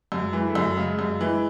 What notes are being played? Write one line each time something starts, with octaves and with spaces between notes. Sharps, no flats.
F#2
G#3
E3
A#3
A3
F#2
C#3 G#3
F#2
E3 G#3